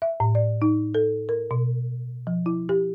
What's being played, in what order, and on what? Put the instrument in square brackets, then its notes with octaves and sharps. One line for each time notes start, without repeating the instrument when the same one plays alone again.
[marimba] E5
A2
D5
D#4
A4
A#4
B2
F3
E4
G4